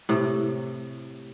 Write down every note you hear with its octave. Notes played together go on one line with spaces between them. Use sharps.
A2 C3